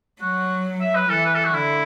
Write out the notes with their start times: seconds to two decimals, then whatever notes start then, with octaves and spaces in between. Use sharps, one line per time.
0.21 F#3 F#4
0.80 E5
0.95 B4
1.09 E3 A4
1.25 B4
1.35 A4
1.45 F#4
1.53 D3 E4